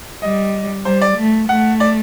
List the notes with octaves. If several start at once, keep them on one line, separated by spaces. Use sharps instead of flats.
G3 D#5
G3 C5
D5
A3
A3 F#5
D5